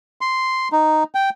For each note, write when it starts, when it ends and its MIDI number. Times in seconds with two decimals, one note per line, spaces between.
0.21 0.68 84
0.72 1.03 63
1.15 1.30 79